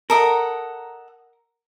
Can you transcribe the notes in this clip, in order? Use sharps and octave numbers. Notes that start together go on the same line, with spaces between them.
A4 A#4 D#5 F#5